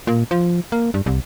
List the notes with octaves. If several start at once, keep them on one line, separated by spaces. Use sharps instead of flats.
A#2
F3
A#3
G2
C2